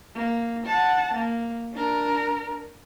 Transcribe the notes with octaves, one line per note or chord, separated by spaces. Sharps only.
A#3
F#5 A5
A#3
D4 A#4